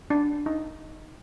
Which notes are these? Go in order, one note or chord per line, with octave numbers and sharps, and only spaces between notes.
D4
D#4